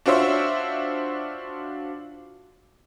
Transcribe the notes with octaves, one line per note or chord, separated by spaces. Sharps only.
D4 F4 F#4 C5 C#5 E5